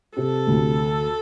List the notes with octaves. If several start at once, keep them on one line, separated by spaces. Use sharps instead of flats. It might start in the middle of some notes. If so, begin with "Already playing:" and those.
C3 A4
D2